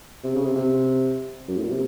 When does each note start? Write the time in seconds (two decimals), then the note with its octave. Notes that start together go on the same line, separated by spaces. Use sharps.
0.24 C3
0.35 C#3
0.45 C3
0.55 C3
1.48 F#2
1.56 A2
1.64 A#2
1.72 C3